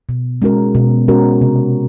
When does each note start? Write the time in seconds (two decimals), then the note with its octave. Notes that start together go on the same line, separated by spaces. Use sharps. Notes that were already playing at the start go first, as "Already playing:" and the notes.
0.09 B2
0.42 G#3 C#4 F#4 A#4
0.75 B2
1.08 G#3 C#4 F#4 A#4
1.41 C3